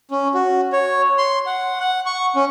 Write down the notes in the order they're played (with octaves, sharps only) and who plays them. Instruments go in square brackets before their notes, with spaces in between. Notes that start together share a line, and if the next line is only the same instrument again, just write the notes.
[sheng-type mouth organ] C#4
F#4
C#5
C6
F#5
F#5
C#6
C#4